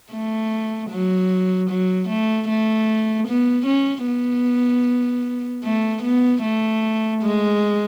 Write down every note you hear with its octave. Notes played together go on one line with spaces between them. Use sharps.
A3
F#3
F#3
A3
A3
B3
C#4
B3
A3
B3
A3
G#3